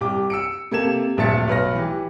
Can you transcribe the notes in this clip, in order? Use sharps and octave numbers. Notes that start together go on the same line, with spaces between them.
C2 G4 D6
E6 C#7 D7
C3 A#3 A4 G#6 E7
D1 A#1 E5 A5 A6 C#7
B1 B4 F6 A#6
E3 G4